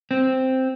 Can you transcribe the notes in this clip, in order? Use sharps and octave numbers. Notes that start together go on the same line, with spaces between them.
C4